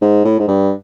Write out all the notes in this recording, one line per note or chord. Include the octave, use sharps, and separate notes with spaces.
G#2
A2
G#2
G2